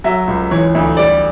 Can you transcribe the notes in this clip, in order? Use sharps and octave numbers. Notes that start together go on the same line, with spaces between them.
F#3 E5
C#2
E3 C#5
D2
G3 D5